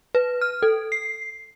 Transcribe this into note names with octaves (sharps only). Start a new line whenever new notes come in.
B4
F6
A4
C7